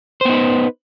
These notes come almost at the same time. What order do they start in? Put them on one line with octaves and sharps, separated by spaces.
C5 B3 D#4 B4